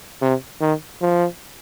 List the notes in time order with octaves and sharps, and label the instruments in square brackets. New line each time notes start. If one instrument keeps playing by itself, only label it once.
[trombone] C3
D#3
F3